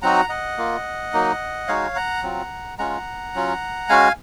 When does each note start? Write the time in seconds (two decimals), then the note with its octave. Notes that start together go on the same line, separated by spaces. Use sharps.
0.02 F#3 C4 D#4 F#4 F#5 A#5
0.29 D#5 F#5
0.57 A#3 F4
1.13 F#3 A#3 D#4
1.68 G#3 D#4 F#4 C#5 F5
1.95 F#5 A#5
2.23 F#3 C4 F4
2.78 G#3 C#4 F4 F#5 A#5
3.34 F#3 C#4 F4
3.89 G#3 C#4 F#4 F5 G#5